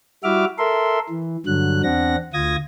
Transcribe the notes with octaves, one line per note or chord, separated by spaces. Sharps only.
G3 E4 F#4 E5 D6 F6
A4 A#4 E5 C6
E3
G2 D3 F#3 F#6
E2 C4 D4 F#5 A#6
D2 F4 D#6 G#6 A#6